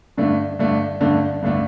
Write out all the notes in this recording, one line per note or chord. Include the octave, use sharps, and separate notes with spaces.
G2 D3 A3 D4
G2 D3 A3 D4
G2 D3 A3 D4
G2 D3 A3 D4